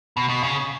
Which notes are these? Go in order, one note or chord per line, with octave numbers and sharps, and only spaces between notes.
B2
B2
C#3